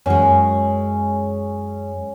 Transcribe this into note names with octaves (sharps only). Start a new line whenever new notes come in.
F#2 G#3 C#4